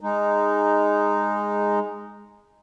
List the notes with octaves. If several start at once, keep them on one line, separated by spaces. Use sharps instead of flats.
G#3 D#4